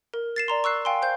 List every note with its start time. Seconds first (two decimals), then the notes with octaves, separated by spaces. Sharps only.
0.14 A#4
0.36 A6 C7 E7
0.48 D5 A#5 C6
0.64 C#6 E6 F#6 C7
0.85 F5 G5 G#5 C6
1.02 C5 F5 G6